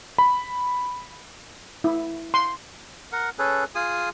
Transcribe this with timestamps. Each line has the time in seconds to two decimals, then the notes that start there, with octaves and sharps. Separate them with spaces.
0.18 B5
1.84 E4
2.34 C6
3.12 A#4 F#5
3.39 C#4 G#4 A4 B4
3.75 F4 G#4 G#5 D#6